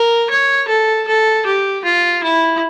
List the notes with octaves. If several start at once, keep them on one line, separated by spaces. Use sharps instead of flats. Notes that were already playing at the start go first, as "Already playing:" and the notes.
Already playing: A#4
C#5
A4
A4
G4
F4
E4